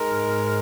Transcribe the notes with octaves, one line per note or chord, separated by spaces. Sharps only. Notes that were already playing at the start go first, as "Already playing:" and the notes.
Already playing: G#3 D#4 A#4
G#2